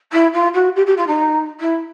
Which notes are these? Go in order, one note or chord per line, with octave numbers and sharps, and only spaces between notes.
E4
F4
F#4
G4
G4
F4
D#4
E4